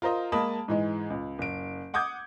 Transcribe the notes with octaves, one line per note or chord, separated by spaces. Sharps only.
F4 A#4 C5 D#5
G#3 A#3 A5 B5 D#6
G#2 E3 G#3
C#2
F#1 D7
F#5 D6 D#6 G6 G#6